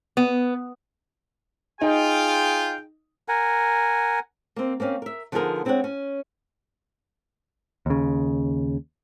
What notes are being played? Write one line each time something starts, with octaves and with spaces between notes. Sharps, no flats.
B3
D#4 F4 G#4 G5
A#4 F#5 G#5
A#3 C4
A#3 C4 C#4 F5
A#4 E5
D3 F3 B3 D#4 G#4 A#4
G#3 C4 D4 B4 C#5 F#5
C#4
D#2 C#3